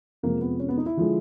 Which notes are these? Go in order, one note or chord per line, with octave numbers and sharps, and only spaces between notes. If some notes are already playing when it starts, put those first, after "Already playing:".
F2 C3 F3 G#3 A#3
B3
C#4
B3
D#4
E4
D3 F3 G#3